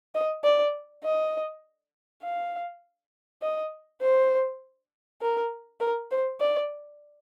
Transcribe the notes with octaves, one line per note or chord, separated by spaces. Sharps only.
D#5
D5
D#5
F5
D#5
C5
A#4
A#4
C5
D5